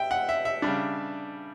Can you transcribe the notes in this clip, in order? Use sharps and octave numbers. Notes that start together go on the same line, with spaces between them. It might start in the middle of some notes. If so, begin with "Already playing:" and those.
Already playing: E5 G5
F#5
E5
E5
C#3 G3 D4